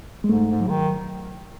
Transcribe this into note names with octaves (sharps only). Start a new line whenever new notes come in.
G#3
G#2 A3
G#2
F#3
C#3
D#3